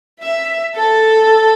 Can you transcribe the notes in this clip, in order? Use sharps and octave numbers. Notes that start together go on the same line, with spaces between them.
E5
A4